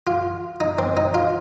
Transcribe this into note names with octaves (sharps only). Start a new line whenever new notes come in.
F4
D#4
C4
D#4
F4